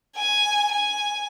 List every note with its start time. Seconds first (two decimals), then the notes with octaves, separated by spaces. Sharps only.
0.17 G#5
0.72 G#5